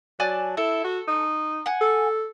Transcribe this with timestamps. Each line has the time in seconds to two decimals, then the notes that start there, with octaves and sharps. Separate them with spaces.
0.20 F#3 D5 G#5 A5
0.57 E4 A4
0.84 F#4
1.08 D#4
1.66 F#5 G#5
1.81 A4